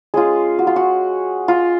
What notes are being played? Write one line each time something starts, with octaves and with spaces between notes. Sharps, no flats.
G#3 C#4 F4 G#4
F#4
F4
F#4
F4